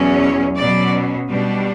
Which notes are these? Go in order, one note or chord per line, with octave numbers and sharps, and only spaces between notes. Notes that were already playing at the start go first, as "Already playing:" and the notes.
Already playing: E2 B2 F#3 C#4
C#5
B2 F#3 C#4 D5
B2 G3 D4